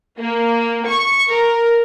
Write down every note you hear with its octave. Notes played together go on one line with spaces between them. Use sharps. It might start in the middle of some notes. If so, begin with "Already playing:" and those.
A#3
C#6
A#4